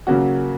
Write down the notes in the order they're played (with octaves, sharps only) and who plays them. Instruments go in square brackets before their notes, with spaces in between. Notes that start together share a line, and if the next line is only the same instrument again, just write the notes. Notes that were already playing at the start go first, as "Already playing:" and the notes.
[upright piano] C#3 F#3 A#3 C#4 F#4